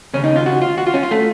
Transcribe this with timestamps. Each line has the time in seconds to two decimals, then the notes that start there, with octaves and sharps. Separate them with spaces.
0.14 D#2 C#3 C#4
0.24 D#4
0.36 F4
0.46 F#4
0.62 F4
0.78 F#4
0.87 F4
0.94 C#4
1.03 F4
1.11 A3